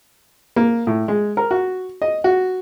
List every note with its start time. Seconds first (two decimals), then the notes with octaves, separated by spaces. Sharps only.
0.56 A#3
0.87 A2
1.08 G#3
1.37 A#4
1.51 F#4
2.02 D#5
2.24 F#4